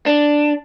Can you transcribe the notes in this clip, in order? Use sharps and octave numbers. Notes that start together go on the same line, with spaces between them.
D4